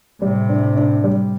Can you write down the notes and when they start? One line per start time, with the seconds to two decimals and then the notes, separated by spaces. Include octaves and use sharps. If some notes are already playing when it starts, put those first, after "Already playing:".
0.21 A2 C3 G3
0.49 D4
0.76 D4
1.04 G3